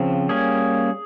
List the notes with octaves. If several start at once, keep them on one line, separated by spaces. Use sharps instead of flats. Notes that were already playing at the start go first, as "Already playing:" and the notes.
Already playing: C#3 F3 C4
G3 A#3 C#4 G#4